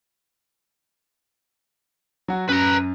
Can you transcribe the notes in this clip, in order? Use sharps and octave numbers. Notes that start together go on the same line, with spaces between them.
F#3 F#4
F#2 B4 A#5